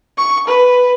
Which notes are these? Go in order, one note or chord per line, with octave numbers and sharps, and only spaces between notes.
C#6
B4